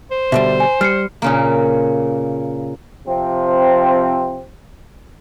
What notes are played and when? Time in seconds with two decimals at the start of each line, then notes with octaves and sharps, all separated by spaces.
0.11 C5
0.32 B2 D3 G3 E5
0.60 G#5
0.81 G3 F6 C7 C#7
1.22 A#2 C#3 A#3
3.08 C3 F3 C4